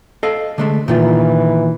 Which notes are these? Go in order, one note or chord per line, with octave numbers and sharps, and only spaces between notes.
A4 D#5 F5
D3 G#3 A3
A#2 D#3 E3 F4